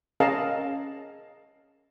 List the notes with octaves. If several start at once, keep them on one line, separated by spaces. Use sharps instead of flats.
C#4 G#4 A#4 D#5 F5 A5